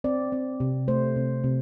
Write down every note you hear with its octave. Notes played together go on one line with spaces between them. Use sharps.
C4 D5
C4
C3
A3 C5
C3
C3